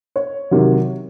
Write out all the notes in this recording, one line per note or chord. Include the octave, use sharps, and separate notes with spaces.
C#5
C3 D#3 F#3